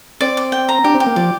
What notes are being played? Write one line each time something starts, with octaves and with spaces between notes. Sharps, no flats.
C4 D5
D5
G5
A#5
D4 G4
C4
G4
A#3
F3 D5